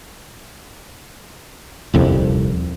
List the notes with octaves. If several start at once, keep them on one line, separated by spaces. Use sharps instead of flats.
D#1 C2 F2